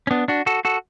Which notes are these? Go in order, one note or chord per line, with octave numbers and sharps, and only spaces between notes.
C#4
B3 D4
D4 F#4
F#4 A4
F#4 A4